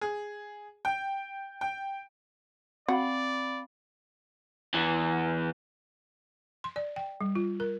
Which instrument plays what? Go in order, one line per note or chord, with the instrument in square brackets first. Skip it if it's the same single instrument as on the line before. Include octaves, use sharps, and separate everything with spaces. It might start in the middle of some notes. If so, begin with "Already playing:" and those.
[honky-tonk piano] G#4
G5
G5
[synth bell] C4 F5 B5 [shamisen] F#4 [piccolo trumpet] D5
[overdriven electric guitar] E2 E3
[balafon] C6
D5
G5
G3
F4
A#4